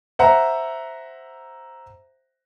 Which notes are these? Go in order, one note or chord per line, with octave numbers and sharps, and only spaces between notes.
C5 E5 F#5 A#5